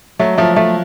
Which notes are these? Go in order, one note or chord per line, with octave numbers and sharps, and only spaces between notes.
F#3 A3
F3 A3
A3